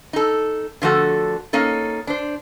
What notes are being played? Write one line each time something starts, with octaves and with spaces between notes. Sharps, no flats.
D#4 A4
D3 F3 A3 F#4 A4
A#3 C#4 D#4 A4
D4 C5